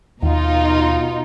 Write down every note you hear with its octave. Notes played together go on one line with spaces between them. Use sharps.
D#2 B2 D#4 F4